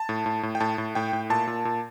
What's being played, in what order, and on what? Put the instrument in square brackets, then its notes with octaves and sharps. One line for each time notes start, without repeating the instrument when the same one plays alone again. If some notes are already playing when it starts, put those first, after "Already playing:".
Already playing: [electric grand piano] A5
A2
A2
A2
G5
A2 A5
A2
A2 G5
A2
A#2 A5
A#2
A#2